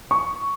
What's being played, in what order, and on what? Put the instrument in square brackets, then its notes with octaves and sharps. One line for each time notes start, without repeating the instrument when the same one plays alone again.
[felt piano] C#6